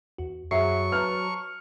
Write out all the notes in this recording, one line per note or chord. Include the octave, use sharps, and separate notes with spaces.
E2 F#4
F#2 F#3 G#4 E5 C#6 C7
B4 A5 A#5 F6